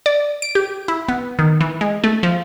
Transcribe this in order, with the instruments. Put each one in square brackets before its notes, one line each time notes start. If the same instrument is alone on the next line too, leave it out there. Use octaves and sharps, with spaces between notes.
[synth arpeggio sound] D5
D7
G4
E4
B3
D#3
E3
G#3
A3
F3